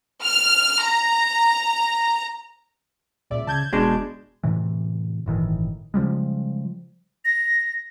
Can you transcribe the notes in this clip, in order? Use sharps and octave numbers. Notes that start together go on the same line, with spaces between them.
F6
A#5
C#2 A#2 D5 E5
C#3 A5 G6 G#6
E1 B2 G#3 D4
A2 C3 E3
G1 A2 D#3 E3
C#3 F3 G3 G#3
A#6